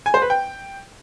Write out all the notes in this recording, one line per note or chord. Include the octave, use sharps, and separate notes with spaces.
G#5
C5
B4
G5